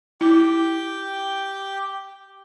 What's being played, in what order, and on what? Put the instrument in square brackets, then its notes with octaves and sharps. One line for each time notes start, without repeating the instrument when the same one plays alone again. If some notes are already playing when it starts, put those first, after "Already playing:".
[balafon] E4 [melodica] G4 G5